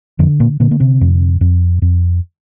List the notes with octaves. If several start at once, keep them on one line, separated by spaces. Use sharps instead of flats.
F2 D3 F3
A#2 A#3
A#2 D3 A#3
A#3
C3 C4
F2
F2
F2